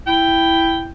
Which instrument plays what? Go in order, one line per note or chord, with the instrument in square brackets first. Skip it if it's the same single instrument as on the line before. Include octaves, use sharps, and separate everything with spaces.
[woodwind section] E4 [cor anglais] G5